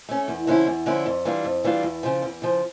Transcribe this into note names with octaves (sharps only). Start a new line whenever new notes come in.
A3 C#4
E2
D3 F3 C#4 E4
E2
D3 F3 C#4 E4
F2
E3 G3 D4 F4
F2
E3 G3 D4 F4
E2
C#3 F3
E2
C#3 F3